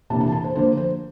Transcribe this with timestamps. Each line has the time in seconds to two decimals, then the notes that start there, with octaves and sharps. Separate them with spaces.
0.10 C3 E3 A#3 D4 A5
0.21 A5
0.32 A5
0.44 C5
0.55 D3 F3 A#3 C5
0.77 C5